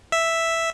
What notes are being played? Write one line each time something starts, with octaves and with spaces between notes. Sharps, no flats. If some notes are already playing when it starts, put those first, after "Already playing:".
E5